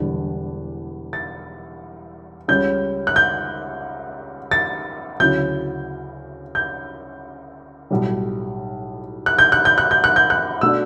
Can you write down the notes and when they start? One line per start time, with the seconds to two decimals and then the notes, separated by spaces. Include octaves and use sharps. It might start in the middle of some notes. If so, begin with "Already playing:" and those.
Already playing: E1 E2 D3 G3 D4
1.13 A6
2.48 C#2 C#3 G3 C#4 G6
3.07 F#6
3.16 G6
4.51 A6
5.20 D2 C#3 F#3 C#4 E4 G6
6.55 G6
7.90 B1 A2 G3
9.26 F#6
9.39 G6
9.52 F#6
9.65 G6
9.78 F#6
9.91 G6
10.04 F#6
10.16 G6
10.30 F#6
10.61 B2 A3 D4 E6